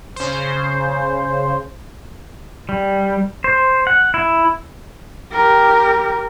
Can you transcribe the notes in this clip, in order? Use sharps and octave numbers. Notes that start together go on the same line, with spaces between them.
C#3 C5
G3
C5
F#5
E4
G4 A#4